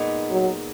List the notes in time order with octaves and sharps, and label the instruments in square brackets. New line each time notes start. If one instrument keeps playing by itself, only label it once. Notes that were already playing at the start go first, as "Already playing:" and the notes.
Already playing: [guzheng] A#2 G#3 B3 D#4
[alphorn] F#3